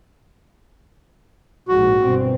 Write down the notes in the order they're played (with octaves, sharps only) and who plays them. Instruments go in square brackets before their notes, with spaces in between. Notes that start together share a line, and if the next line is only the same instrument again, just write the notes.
[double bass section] A#1 G#2 [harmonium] F#4
[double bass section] G1 B2 C4